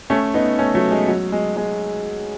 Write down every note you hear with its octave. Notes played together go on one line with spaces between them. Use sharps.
A3 C#4
B3 D#4
A3 C#4
F#3 A3
G#3
F#3
G#3
G#3